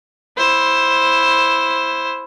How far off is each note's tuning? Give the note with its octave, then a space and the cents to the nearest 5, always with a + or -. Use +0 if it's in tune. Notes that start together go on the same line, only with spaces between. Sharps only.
E4 +0 C5 +10